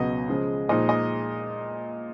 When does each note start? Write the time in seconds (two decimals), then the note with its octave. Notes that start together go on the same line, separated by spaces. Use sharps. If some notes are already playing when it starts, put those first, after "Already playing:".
Already playing: C#2 B2 F#3 B3 D#5
0.28 C#3 F3 G#3
0.69 A#2 F3 G#3 D#4 D#5
0.89 D#5